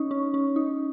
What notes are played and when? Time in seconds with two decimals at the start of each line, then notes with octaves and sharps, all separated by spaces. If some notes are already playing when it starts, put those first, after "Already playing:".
Already playing: C#4 D#4
0.11 C#4
0.34 C#4
0.56 D#4